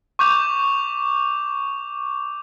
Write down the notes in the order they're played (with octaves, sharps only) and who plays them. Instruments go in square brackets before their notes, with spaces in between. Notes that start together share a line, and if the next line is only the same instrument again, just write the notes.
[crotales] C#6 D6 G6 F7